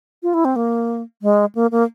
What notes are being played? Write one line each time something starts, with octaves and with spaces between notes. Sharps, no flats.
F4
E4
C4
A#3
G#3
A#3
A#3